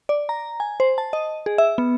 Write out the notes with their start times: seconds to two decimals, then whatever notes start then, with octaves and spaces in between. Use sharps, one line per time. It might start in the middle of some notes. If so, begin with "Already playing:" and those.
0.09 D5
0.29 A#5
0.60 G#5
0.80 C5
0.98 A5
1.13 D#5
1.46 G#4
1.58 E5
1.78 B3